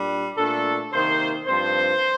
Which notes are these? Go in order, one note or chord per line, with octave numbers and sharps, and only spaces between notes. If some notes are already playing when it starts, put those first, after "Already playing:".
Already playing: A#2 G3 D4
A#2 A3 D4 A4
C3 D#3 A#3 D#4 C5
G2 F3 C4 C5